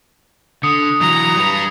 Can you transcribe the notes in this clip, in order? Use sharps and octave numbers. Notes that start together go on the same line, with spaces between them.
D3 D#6 C#7
E3 F#3 A#5
G3 B4